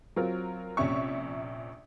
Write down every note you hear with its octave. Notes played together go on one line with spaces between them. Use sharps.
F#3 C4 F4 A#4
A#1 C3 C#4 E5 C#6